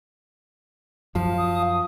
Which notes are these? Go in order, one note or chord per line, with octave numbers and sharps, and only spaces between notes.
F#2 F3 F5 A5
D#6